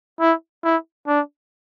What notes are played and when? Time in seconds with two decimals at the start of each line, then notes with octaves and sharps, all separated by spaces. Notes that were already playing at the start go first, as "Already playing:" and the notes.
0.20 E4
0.64 E4
1.07 D4